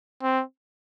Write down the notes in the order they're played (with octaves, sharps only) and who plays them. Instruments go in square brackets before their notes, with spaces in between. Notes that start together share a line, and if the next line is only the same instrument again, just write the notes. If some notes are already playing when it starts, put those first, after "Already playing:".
[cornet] C4